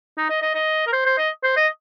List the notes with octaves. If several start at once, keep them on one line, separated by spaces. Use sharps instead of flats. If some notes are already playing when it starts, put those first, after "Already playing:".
D#4
D#5
D#5
D#5
A#4
C5
C5
D#5
C5
D#5